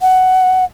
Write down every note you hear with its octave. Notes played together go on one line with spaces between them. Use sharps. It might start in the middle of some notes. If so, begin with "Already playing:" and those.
F#5